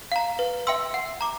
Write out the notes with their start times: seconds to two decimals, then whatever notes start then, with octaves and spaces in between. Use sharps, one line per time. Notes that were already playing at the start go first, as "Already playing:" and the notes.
0.12 F5 A#5
0.39 B4
0.67 E5 G5 C6 E6
0.94 F#5
1.21 A#5 D6